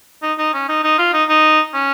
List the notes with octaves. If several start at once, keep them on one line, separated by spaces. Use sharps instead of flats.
D#4
D#4
C#4
D#4
D#4
F4
D#4
D#4
C#4